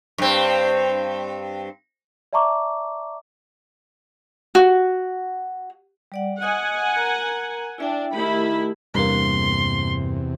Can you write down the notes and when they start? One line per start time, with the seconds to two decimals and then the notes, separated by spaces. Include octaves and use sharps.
0.18 G2 C4
2.33 D5 E5 A5 A#5 C#6 D6
4.55 F#4
6.12 G3 D5 F#5
6.42 D#5 F#5 G#5 D#6
6.96 A#4 A#5
7.78 D4 E4 E5 G5
8.13 D#3 A3 E4 G4 B5
8.95 E2 G2 C3 A#3 C6